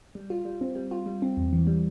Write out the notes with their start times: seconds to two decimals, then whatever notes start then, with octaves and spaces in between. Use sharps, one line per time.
0.15 G3
0.30 F4
0.45 G3
0.61 C4
0.75 G3
0.91 F4
1.06 G3
1.22 C4
1.37 E2
1.53 E3
1.67 G3